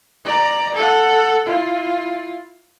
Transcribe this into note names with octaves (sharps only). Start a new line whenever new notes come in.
D5 A#5
A4 F#5
E4 F4